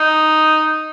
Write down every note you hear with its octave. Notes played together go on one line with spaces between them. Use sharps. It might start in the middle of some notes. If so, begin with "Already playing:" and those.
Already playing: D#4